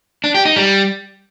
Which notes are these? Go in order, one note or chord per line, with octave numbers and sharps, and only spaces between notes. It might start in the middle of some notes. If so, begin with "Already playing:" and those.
D4
G4
D#4
G3